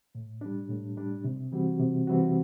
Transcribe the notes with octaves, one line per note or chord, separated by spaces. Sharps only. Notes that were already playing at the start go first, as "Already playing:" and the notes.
A2
G3 D4
A2
G3 D4
C3
E3 G3 C4 F#4
C3
E3 G3 C4 F#4